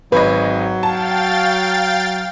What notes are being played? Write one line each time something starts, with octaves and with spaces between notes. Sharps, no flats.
G#1 F#3 B4 D#5
F5 G5 A5 A6